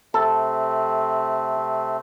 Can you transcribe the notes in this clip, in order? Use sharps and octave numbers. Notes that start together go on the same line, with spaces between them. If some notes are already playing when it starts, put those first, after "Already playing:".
C3 A3 C4 A4